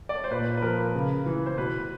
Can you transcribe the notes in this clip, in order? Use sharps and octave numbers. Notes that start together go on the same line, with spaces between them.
D5
C#5
C5
A#2 B4
B4
F3 A#4
C#3
E3
C5
B2 B4